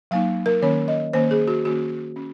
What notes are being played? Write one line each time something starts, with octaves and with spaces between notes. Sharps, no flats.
F#3 A#3 D#4 F5
A#4
D#3 A#3 C#4 C#5
D#5
D#3 A#3 C#4 C5
G#4
F#4
D#3 A#3 C#4 F#4
C#4